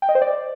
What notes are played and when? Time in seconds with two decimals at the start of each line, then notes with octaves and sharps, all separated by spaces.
0.02 G5
0.09 D#5
0.15 C5
0.22 D5